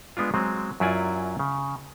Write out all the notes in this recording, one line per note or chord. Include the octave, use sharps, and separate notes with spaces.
G#3 B3 D4 F4
F#3 G#3 C4
F#2 F#3 E4 F4 D5 G#5
C#3